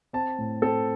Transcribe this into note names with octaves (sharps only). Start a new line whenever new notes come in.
C4 A5
A2
C4 A4